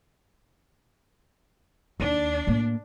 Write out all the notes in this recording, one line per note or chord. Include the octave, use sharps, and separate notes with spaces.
D#2 D4
A2 A#3